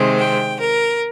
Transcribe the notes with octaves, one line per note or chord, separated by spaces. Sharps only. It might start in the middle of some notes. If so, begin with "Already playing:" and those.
Already playing: C3 D#3 G#3 C4
G5
A#4